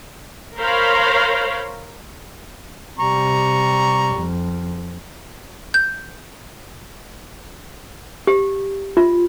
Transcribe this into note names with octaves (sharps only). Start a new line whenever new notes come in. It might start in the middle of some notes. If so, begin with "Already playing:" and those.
A#4 C5 C#5 F5 A#5 B5
C3 G3 A#5 C#6
F2
G6
G4
F4